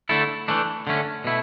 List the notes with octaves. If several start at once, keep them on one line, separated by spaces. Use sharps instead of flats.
D3 A3 E4 A4
E3 A3 D4
D3 A3 C#4
B2 A3 E4